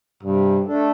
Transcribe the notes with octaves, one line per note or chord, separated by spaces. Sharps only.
G2 C3
A3 D4 A4